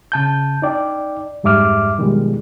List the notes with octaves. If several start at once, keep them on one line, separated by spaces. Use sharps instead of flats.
C#3 A5 G6
D#4 D5 G5
F2 G#2 G3 E5 D6 F6
B2 D#3 F3 G3 G#3